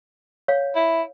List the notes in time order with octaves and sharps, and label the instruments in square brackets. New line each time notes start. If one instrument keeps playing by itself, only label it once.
[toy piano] C#5 F5
[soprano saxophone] E4